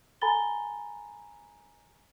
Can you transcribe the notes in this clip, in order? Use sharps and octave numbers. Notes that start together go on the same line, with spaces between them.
A4 G#5 A#5 B5 A6 G7